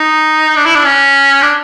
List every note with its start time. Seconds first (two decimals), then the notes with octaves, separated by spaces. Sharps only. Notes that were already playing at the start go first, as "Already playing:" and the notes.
Already playing: D#4
0.56 D4
0.66 E4
0.75 D4
0.85 C#4
1.42 D4